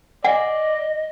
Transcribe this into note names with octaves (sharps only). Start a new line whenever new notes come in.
D5 D#5 F#5 G#5